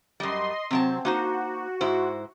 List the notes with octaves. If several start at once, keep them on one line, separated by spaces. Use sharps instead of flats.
F#2 G3 D#5 C6
C3 F#3 C4 A5
A#3 D#4 F#4 C5
G#2 E4 C5